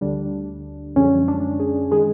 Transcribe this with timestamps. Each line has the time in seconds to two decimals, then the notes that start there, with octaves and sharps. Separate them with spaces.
0.01 D2 D3 G3 D4
0.96 F#2 D3 F3 G#3 C#4
1.28 D4
1.60 G#4
1.91 D#3 G#3 G#4